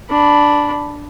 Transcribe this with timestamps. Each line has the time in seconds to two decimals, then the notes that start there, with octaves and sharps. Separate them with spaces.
0.10 D4 B5